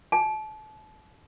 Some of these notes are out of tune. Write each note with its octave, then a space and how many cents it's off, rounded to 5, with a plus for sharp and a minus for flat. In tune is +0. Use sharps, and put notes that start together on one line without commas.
A5 -30